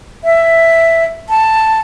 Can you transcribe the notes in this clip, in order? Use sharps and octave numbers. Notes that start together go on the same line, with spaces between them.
E5
A5